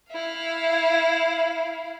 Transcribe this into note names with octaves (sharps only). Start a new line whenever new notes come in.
E4 F5